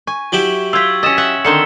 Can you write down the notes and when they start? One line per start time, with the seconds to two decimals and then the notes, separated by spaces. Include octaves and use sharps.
0.07 G#5 C#6
0.32 F#3 E4 G4
0.73 F4 G5 E6 G#6 B6
1.03 C#4 D#5 E6 A6 E7
1.17 E5 F#5 G5
1.45 D3 D#3 C4 C#7 G7